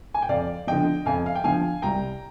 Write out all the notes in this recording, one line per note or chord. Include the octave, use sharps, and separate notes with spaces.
G#5
G5
F2 D5 F5
D3 F3 D#5 G5
F2 F5 G#5
F5
G5
D3 F3 F5 G#5
C2 G5 A#5